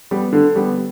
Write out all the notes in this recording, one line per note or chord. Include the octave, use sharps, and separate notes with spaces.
G3 B3
D3
G3 B3